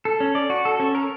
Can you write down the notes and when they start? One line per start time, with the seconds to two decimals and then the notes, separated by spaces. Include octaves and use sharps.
0.05 A4
0.20 C#4
0.35 D5
0.50 F#4
0.65 A4
0.80 C#4
0.95 A#4